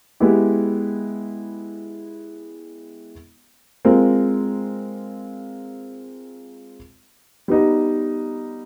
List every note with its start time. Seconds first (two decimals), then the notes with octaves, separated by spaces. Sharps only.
0.20 G#3 B3 E4 G4
3.85 G#3 C4 F4 A#4
7.48 G3 B3 D#4